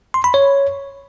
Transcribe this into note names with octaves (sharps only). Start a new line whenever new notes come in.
C6
B5
C#5